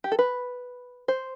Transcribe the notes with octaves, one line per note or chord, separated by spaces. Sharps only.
G4
A4
B4
C5